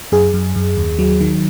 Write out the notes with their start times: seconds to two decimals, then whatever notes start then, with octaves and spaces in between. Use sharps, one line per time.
0.12 F#2 G#4
0.34 F#2
0.56 F#2
0.77 D#2
0.99 F#3
1.21 D#3